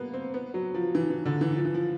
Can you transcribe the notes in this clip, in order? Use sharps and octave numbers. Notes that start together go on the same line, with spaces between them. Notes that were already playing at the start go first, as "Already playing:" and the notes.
Already playing: G3 A#3 B3
C4
B3
F#3
F3
E3
E3
D3
E3
F3
E3
F3